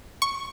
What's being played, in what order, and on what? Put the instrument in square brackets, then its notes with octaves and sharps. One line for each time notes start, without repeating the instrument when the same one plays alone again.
[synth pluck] C#6